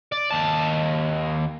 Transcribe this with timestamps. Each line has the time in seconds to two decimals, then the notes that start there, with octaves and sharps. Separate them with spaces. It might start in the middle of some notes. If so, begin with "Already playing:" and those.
0.12 D5
0.31 D#2 A5